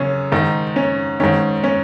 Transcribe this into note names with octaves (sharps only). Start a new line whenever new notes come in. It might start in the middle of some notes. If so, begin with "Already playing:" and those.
Already playing: F#2 C#3 C#4
G#2 D#3 D#4
C#4
G#2 D#3 C#4
C#4